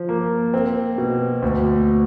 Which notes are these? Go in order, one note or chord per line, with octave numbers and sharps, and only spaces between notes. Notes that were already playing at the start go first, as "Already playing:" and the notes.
Already playing: F3
A#3
C4
B2
D2